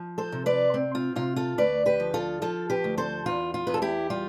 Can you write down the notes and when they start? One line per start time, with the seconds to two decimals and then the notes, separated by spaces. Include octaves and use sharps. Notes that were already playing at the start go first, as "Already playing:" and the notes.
Already playing: F3
0.18 A4 C5
0.32 C3
0.46 B4 D5
0.74 C4
0.95 F4
1.16 C3 F4
1.36 F4 A4
1.58 D2 B4 D5
1.86 G4 B4
2.00 F3
2.14 F4 A4
2.42 F3 F4 A4
2.70 G4 B4
2.84 D2
2.98 A4 C5
3.26 E2 F4
3.54 F4
3.67 E2 B4
3.74 A4
3.82 E4 G4
4.10 G3 F4